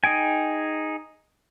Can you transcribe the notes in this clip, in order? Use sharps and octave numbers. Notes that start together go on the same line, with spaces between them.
D#4 G#4 G5 G#5